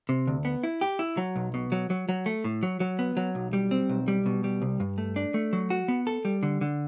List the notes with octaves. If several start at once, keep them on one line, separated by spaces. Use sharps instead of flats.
C3
D2
B3
E4
G4
E4
F#3
B1
B2
F#3
F#3
F#3
A3
A2
F#3
F#3
B3
F#3
B1
G3
C4
B1
G3
B2
G3
C2
G2
A3
D4
A3
F#3
F#4
B3
A4
G3
D3
D3